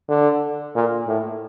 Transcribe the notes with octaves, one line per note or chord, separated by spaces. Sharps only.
D3
A#2
A2